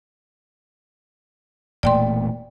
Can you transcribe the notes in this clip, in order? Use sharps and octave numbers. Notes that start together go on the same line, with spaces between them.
E1 A#2 A3 D5 G5 C6